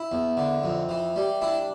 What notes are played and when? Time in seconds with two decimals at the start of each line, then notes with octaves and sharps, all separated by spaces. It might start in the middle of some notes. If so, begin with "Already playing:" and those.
Already playing: E4
0.12 E2
0.37 D3
0.63 F2
0.89 E3
1.16 G3
1.41 D4 E4